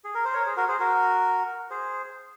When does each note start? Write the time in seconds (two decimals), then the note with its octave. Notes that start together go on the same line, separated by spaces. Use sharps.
0.04 G#4
0.15 A#4
0.25 C5
0.34 A#4 C#5
0.46 G#4 C5
0.56 F#4 A#4
0.68 G#4 C5
0.79 F#4 A#4
1.70 G#4 C5